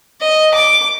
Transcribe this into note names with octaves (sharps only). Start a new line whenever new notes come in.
D#5
D6